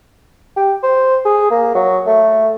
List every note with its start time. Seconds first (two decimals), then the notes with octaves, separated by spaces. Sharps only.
0.57 G4
0.83 C5
1.25 G#4
1.51 A#3
1.75 F#3
2.07 A3